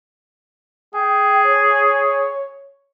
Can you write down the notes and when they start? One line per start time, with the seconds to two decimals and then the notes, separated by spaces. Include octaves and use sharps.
0.94 G#4 G5
1.45 C#5